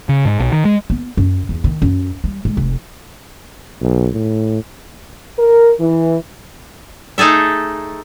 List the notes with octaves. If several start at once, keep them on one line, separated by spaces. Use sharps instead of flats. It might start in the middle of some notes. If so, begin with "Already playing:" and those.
C#3
G#2
B1
D#3
G#3
B3
F#2
E2
D#3
F#2
G3
G#3
F1
B1
A2
A#4
E3
A3 D#4 G#4 A4 E5